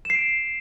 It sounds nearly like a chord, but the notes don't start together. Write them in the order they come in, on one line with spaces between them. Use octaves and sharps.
E7 C7 D7